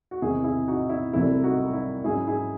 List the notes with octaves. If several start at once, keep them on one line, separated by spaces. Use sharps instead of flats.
F#4
E2 C3 D#3 G#3 C4 E4 G#4
E4 G#4
D#4 F#4
E4
C2 C3 F#3 A3 C4 E4
D#4 F#4
E4
G#2 F#3 C#4 E4 G#4
E4 G#4